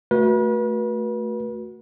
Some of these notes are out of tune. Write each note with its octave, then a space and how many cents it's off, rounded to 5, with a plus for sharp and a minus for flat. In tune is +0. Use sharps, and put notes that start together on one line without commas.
A3 +0 F#4 -10 B4 -40